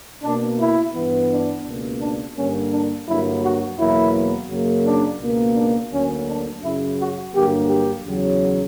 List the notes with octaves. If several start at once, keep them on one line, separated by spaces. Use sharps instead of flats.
B2 A#3 D4
E4
G2 E3 B3
D4
C#2 B2 A#3
D4
G2 D3 G3 A#3 C#4
D4
G2 D3 F#3 A#3 E4
F#4
E2 B2 F#3 A#3 E4
F#2 C#3 F#3 A#3
D4
C#2 B2 A#3
D4
D2 D3 F#3 A#3 C#4
D4
F#2 C#3 F#3 E4
F#4
G2 D3 F#3 A#3 G4
G4
E2 C#3 F#3